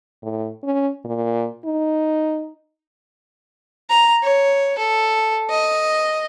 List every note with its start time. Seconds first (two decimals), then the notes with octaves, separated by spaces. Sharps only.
0.22 A2
0.64 C#4
1.05 A#2
1.65 D#4
3.90 A#5
4.23 C#5
4.78 A4
5.50 D#5